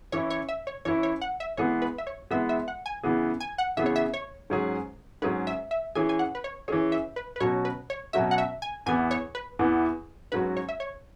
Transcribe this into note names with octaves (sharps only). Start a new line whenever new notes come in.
E3 C#4 E4 C#5
C#5
E5
C#5
E3 C#4 E4 C#5
C#5
F#5
E5
E3 G#3 B3 G#4 C#5
B4
E5
C#5
E3 G#3 B3 G#4 E5
E5
F#5
G#5
C#3 E3 B3 G#4
G#5
F#5
C#3 E3 B3 G#4 E5
C#5
E5
C#5
G#2 F#3 C#4 G#4
G#2 F#3 C#4 G#4 B4
E5
E5
E3 C#4 G#4 G#5
G#5
F#5
B4
C#5
E3 C#4 G#4 C#5
E5
B4
B4
B2 F#3 C#4 F#4 C#5
B4
C#5
B2 F#3 C#4 F#4 E5
F#5
E5
G#5
E2 E3 B3 G#5
C#5
B4
E2 E3 B3
G#2 F#3 C#4 F#4 B4
C#5
E5
C#5